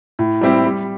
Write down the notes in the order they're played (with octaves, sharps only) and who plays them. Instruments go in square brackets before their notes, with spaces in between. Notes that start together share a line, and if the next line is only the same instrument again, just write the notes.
[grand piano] A2
G3 C4 E4 G4
G3